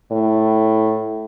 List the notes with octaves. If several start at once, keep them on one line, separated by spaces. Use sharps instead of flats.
A2